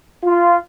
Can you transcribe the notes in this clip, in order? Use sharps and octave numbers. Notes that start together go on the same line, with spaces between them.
F4